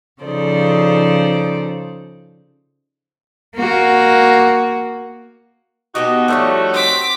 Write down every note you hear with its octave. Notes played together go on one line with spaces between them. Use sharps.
C#3 F3 D#4 A4 C5 D5
A#3 F#4
B2 B3 D#4 F#4 G4 D#5
F3 G3 A3 C#5
C4 D6 B6